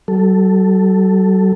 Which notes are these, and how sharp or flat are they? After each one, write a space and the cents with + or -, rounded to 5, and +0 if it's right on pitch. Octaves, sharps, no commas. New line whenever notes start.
F#3 +45 A4 +0